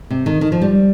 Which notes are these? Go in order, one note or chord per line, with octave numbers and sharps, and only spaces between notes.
C3
D#3
D#3
F3
G3